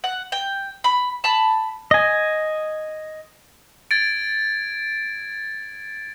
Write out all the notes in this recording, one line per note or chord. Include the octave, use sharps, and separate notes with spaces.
F#5
G5
B5
A5 B5
D#5 G#5
G#6 A6 D7